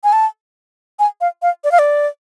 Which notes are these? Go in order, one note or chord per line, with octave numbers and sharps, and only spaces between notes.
G#5
A5
G#5
F5
F5
D5
F5
D5